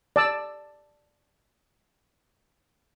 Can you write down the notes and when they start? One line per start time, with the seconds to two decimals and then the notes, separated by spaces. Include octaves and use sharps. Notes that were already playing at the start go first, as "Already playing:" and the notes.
0.16 D5 A5 E6